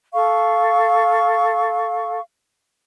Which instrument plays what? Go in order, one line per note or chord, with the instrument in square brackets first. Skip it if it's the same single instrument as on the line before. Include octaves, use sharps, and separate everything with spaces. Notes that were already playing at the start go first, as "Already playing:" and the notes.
[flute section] A4 F5 C#6